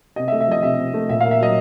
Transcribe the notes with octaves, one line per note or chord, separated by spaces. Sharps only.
C3 D#5
E5
A3
E5
F3 D#5
C3 E5
C3
A3
A#2 E5
A#3 F5
E5
F#3 D#5